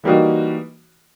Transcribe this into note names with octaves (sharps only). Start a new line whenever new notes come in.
E3 G3 A#3 D#4 F#4